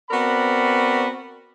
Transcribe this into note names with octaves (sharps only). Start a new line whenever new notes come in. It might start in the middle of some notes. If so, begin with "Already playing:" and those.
B3 C4 F#4 A#4 D5 B5